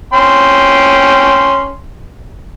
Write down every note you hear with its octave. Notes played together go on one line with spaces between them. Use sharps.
C#4 G5 C6